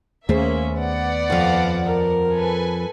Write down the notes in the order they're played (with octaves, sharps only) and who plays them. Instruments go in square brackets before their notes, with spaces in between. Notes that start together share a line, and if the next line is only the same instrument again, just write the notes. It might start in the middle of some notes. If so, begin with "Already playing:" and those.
[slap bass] D#2 A3 [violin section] A#3 C#4 E5 [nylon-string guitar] G#4 C5
[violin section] B3 D5 F#5
[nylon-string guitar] F2 F3 [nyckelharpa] F5
[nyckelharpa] A#4
[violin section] A4 B4 G#5